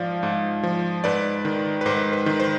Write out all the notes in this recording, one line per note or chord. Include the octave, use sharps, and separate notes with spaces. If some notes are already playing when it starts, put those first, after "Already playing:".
Already playing: G#2 F3 D5 F5
G#2
F3
G#2 B4 D5
D#3
B4
G#2 C5
B4
D#3
C5